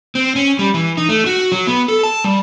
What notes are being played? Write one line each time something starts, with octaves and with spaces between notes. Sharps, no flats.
C4
C#4
G3
E3
D#4
A3
F#4
F#3
B3
A4
A5
G3